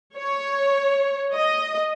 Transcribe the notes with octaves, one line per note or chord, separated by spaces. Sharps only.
C#5
D#5